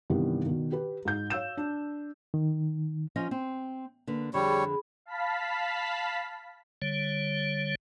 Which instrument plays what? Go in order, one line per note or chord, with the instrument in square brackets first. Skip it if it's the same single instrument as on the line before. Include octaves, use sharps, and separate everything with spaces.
[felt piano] G2 C3 D#3 E3 G3 B3
B2 D#3
G4 B4
G#2 D#4 G6
C#5 F5 E6 G6 E7
D4
[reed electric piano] D#3
[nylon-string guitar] F3 C#4 D#5
C4
D3 A#3 B4
[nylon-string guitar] F2 D3 [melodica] G3 C#5 [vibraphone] G#4 B5
[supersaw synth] F5 A5 B5 B6
[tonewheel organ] D3 G3 C#5